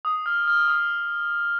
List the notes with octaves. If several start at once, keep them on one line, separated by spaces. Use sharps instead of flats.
D#6
F6
F6
D#6